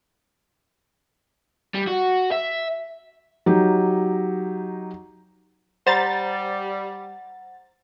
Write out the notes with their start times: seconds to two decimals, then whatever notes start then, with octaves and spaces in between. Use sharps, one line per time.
1.75 G3
1.88 F#4
2.31 E5
3.46 F#3 D#4 G4
5.87 G3 C5 F#5 A#5 A6